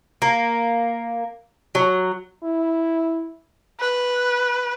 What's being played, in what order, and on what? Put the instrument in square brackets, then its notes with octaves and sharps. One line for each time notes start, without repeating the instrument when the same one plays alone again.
[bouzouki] A#3
F#3
[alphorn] E4
[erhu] B4